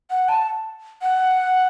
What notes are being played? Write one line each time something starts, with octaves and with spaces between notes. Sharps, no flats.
F#5
A5
F#5